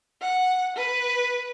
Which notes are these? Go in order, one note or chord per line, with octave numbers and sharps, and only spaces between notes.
F#5
B4